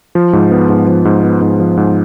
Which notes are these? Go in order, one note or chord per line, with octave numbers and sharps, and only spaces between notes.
F3
G#2
B3
G#2
F3
G#2
B3
G#2
F3
G#2